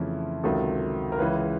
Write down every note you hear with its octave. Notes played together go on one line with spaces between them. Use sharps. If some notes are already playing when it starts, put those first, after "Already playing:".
Already playing: F2 C#3 E3 A3 E4
C#2 C3 D#3 F#3 A4
A#4
C#2 C#3 E3 G#3 B4